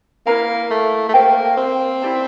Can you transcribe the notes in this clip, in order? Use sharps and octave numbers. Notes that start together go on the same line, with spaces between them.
A#3 E4 A#4 F5 A#5
A3
A3
A#3 G4 C5 G5
C4
E4 G4 D5 A5